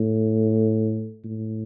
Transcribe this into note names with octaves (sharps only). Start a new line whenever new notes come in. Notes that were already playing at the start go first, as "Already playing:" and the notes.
Already playing: A2
A2